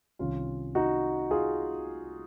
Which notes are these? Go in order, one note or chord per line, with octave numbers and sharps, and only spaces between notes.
C2 C3 D#3 C#4 F4
D#4 F#4
F4 G#4